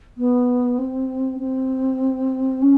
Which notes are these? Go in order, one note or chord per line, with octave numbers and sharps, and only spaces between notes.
B3
C4
C4
C#4